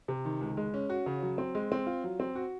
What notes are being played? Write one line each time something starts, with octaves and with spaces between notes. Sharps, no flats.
C3
D#3
C#2
G#3
C#4
F#4
C#3
F#3
C4
G#3
C4
F4
F#3
C4
F#4